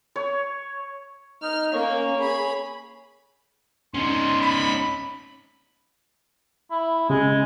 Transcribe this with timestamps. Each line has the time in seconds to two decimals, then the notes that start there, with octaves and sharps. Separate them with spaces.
0.16 C#5
1.42 D#4 F6
1.73 A#3 C#4 A#4 C#5
2.16 G#4 B5
3.95 C#4 D#4 C6
4.41 B5
6.71 E4
7.10 C#3 G#3